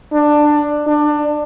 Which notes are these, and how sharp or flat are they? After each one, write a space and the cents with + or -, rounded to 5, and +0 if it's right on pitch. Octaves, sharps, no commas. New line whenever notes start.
D4 +15
D4 +20